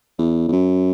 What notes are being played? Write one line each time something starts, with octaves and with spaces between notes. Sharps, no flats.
E2
E2
F#2